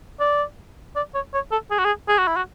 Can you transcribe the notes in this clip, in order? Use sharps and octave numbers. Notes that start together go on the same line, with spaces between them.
D5
D5
C#5
C#5
A4
G#4
F#4
G#4
G#4
F#4
E4
F#4